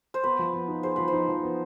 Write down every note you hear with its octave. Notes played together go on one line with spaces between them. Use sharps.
C5
B3 B4
F3
B3
D#4
G#4 C5
F3 B4
C5
D#4
F3
B3